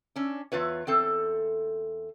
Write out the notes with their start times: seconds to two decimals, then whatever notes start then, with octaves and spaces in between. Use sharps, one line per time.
0.16 C#4 D4
0.52 E2 F4 B4 C#5
0.87 E2 C4 A4